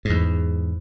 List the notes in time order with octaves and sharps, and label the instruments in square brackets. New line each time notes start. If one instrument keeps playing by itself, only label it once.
[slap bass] E2 G#2